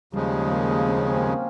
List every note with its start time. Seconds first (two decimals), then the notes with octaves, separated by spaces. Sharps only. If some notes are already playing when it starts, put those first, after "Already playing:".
0.13 D#2 C#3 F3 G3 G#3
0.51 A#3
0.88 C4
0.98 C#4
1.07 C4
1.16 A#3
1.26 C4